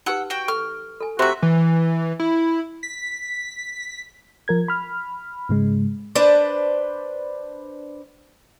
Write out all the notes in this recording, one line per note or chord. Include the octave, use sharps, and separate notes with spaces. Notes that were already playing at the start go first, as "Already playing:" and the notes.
D#4 G4 B4 F#5 E6
F#4 G5
A4 C#6 F6
A4 G#5
C3 A3 F#4 E5 A#5 C6
E3
E4
B6
F3 A#4 G#6
B5 F6
G#2 C#3 G#3
D4 B4 C5